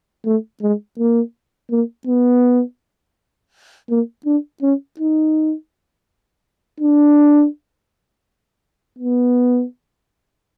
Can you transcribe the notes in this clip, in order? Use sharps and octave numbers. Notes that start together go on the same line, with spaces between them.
A3
G#3
A#3
A#3
B3
A#3
D4
C#4
D#4
D4
B3